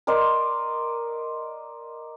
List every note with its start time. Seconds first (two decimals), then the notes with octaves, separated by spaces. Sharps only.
0.07 A#4 D5 D#5 C6